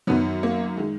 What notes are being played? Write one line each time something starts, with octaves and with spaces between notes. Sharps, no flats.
F#2 D#3 F#3 B3
A#3
D#3 G#3